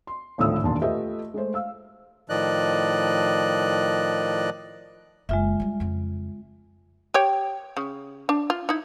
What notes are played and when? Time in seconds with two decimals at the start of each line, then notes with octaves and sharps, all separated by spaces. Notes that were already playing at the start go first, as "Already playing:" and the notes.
0.07 C6
0.38 G#1 D2 A2 F3 D#6 E6
0.63 E1 D#2 A#2 D4 A5 C6
0.82 A3 F4 G4 B4 D#5 E5
1.34 G#3 A3 C5
1.54 F5 E6
2.29 A2 D#3 F3 D5 D#5 F#6
5.29 F#1 G#3 F4 E5
5.60 G3 D4
5.80 F2 C#3
7.14 G4 C#5 G5
7.77 C#3
8.29 D4
8.50 F4
8.69 D#4 E4